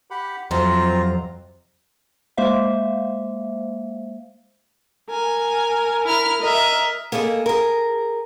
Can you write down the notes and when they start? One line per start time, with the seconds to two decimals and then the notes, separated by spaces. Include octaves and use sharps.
0.11 G4 F#5 B5
0.51 F2 C3 F#3 C4 F4 A#5
2.37 G#3 A#3 C5 E5 F5
5.10 A#4 G#5
6.06 E4 F6
6.42 A#4 D#5 E5
7.12 A#3 G#4 A4 C5 D#5
7.46 G#4 A#4